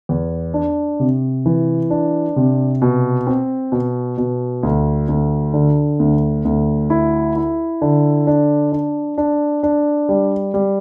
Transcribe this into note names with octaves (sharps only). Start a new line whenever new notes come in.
E2
D4
C3
E3
D4
C3
B2
C4
B2
B2
D2
D2
D3
D2
D2
E4
E4
D3
D4
D4
D4
D4
G3
G3